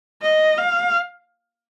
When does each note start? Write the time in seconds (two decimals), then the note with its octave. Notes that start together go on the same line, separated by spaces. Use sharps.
0.22 D#5
0.57 F5